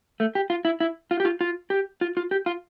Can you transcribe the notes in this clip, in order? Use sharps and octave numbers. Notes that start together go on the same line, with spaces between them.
A3
G4
F4
E4
E4
F4
G4
F4
F4
G4
F4
F4
G4
F4